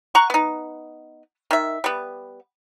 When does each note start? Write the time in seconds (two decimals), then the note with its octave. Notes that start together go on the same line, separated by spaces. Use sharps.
0.15 F#5 A#5 C#6
0.30 B3 D#4
1.51 D#3 E5
1.84 G3 B3